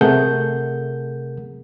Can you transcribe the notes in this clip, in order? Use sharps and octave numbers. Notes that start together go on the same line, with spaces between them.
C3 A3 G#4 A#4 F#5 G6